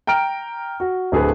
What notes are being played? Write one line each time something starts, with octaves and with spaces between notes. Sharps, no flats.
G5 A#5 F6 D7
F#4
D1 D3 G#4 A4 B4